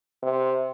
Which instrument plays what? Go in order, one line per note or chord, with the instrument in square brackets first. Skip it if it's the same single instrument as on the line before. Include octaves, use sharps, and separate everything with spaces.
[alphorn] C3